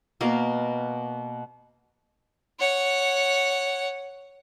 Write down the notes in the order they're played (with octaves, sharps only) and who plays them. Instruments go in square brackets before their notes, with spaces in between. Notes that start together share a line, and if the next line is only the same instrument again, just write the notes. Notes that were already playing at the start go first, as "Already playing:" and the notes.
[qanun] B2 A#3 A#4 F5
[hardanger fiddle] C#5 F#5